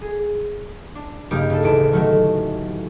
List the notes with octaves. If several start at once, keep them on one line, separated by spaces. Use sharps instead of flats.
G#4
D4
G2 C#3 G3 A#3 D#4 G4
C#3 A4
A1 D2 A3 A5 D7
D#3 F#3 A3